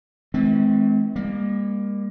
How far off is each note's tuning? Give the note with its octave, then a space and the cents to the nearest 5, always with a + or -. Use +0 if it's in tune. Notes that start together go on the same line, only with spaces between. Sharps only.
E3 -35 G#3 +40 C4 -20
G3 +45 A#3 +10